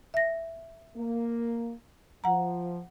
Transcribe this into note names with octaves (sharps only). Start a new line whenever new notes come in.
E5 A#6
A#3
F3 F#5 A#5